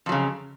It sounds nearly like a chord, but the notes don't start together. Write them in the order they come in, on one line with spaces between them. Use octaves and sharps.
F2 F#3 C#3